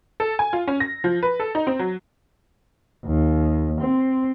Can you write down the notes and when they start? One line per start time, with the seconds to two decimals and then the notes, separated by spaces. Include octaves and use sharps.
0.20 A4
0.39 G#5
0.53 F4
0.68 C#4
0.80 A#6
1.04 F3
1.23 B4
1.40 A4
1.55 D#4
1.67 C4
1.79 F#3
3.05 D#2
3.81 C4